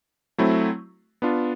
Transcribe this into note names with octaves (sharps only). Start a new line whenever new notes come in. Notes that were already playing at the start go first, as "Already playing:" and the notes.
F#3 A3 C4 E4
B3 D4 F4